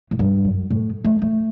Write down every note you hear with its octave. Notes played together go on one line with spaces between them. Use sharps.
A2
G2
F#2
A2
A3
A3